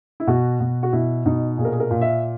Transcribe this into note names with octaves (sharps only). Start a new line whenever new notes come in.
E4
B2 F#4
B2
F#4
B2 E4
B2 D#4
A#2 G#4
A#4
G#4
A#4
A#2
E5